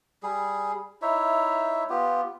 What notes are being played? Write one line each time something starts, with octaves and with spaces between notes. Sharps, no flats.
G3 G#4
D#4 E4 C#5 E5
B3 F4 G4